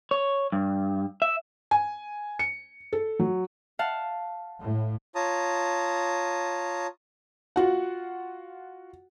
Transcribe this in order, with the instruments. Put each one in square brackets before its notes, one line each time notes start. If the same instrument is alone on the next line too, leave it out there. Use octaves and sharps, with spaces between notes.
[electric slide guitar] C#5
G2
E5
[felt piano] G#5
C#7
A4
F#3
[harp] F5 F#5 A5
[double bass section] A2
[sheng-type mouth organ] F4 C#5 A5 A#5 D#6
[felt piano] F4 F#4 F#5